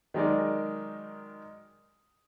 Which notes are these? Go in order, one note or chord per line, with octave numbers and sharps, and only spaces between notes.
D#3 F#3 G#3 D#4 A#4 D5